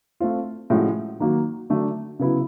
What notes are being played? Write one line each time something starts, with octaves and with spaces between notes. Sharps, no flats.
A3 C4 F4
A2 F3 G#3 C#4 F#4
D#3 F#3 A#3
D3 F#3 A3 D4
C#3 F#3 B3 E4